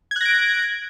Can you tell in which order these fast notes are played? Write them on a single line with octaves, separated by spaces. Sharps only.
G#6 F#6 A#6 D7